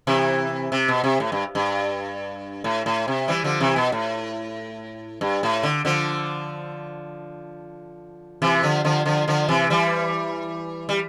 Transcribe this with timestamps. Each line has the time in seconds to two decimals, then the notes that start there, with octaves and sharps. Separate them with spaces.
0.07 C3 E3
0.72 C3
0.89 B2
1.04 C3
1.20 A2
1.32 G2
1.55 G2
2.64 A2
2.86 A2
3.08 C3
3.28 E3 G3
3.44 D3 F3
3.60 C3 E3
3.76 B2
3.92 A2
5.21 G2
5.43 A2
5.63 D3
5.85 D3 F3
8.42 C3 E3
8.63 D3 F3
8.85 D3 F3
9.06 D3 F3
9.28 D3 F3
9.49 C3 E3
9.70 E3 G3
10.89 G3